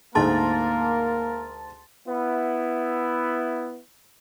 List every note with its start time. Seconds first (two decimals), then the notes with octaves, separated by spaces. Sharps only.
0.15 D2 G#2 A#3 G#4 A#4 A5 C6 A6
2.08 B3 E4